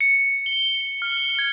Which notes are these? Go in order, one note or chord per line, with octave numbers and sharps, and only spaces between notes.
C#7
G7
F6
G#6